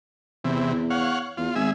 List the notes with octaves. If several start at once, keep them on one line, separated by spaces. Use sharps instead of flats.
E2 C3 E3
C#5 F5 F#5
E2 F4
G#1 G#4 E5